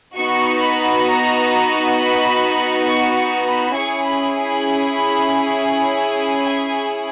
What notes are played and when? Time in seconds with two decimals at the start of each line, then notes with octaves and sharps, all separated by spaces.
0.16 B3 D#4 F#4 C#6
0.61 B5
1.06 A#5
1.96 B5
2.86 C#6
3.15 C#6
3.46 B5
3.76 C#4 E4 G#4 C#6
4.05 B5
4.35 B5
6.44 G#5